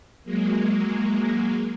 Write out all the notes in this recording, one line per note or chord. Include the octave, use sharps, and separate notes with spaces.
F#3 G#3 A#3